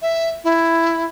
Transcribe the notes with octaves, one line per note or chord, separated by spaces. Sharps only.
E5
E4